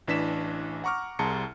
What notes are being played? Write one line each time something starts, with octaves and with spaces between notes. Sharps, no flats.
A1 E3 D4 B6 E7
F#5 A#5 C#6 D6 F6
C2 G#4 A5 A#5 C6 C#7